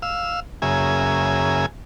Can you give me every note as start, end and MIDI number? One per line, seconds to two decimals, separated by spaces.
0.02 0.40 77
0.02 0.40 88
0.62 1.66 42
0.62 1.66 49
0.62 1.66 58
0.62 1.66 68
0.62 1.66 76
0.62 1.66 80